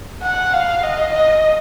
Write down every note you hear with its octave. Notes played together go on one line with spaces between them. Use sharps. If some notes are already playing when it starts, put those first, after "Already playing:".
F#5
F5
D#5
D#5